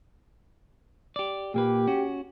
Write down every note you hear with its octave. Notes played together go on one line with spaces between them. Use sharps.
G4 D5
A#2 A#3 G4 B4
C#4 F#4